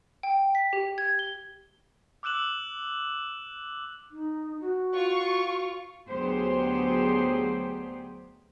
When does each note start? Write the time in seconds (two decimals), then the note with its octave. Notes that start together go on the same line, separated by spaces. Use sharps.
0.23 G5
0.55 B6
0.73 G4
0.98 G#6
1.19 G7
2.23 D6 E6 F#6 E7 F#7
4.11 D#4
4.61 F#4
4.95 F4 C#6
6.08 D2 F#3 B3 G4 G#4 C5